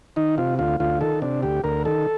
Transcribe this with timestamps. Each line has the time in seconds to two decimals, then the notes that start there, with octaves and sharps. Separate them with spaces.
0.16 D#3 D#4
0.38 C3 F4
0.59 D2 F4
0.80 D2 F4
1.01 D#3 A4
1.22 C3 D4
1.43 D2 G4
1.64 D2 A#4
1.85 D#3 A4